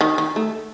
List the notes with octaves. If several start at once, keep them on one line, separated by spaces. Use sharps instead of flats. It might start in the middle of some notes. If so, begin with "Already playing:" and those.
D#3
D#3
A3